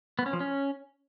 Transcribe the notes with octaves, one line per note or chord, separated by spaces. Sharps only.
B3
C#4
F3
C#4